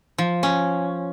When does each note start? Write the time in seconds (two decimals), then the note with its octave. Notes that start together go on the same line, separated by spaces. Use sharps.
0.18 F3
0.43 C#4